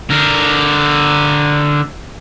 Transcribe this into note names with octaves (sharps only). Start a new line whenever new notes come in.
D3 A#4